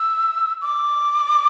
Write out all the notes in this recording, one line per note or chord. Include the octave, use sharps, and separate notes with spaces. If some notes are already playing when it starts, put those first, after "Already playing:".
Already playing: E6
D6